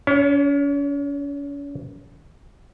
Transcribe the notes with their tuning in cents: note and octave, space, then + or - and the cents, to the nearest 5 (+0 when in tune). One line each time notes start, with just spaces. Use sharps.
C#4 +40 C#5 +0